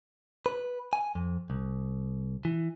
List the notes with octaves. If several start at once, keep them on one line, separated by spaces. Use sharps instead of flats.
B4
G#5
F2
C2
E3